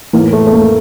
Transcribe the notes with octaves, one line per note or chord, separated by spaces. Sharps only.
A2 E3 A#3
A3
A3
A#3